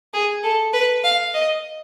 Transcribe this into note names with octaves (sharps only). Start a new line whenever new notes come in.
G#4
A4
B4
F5
D#5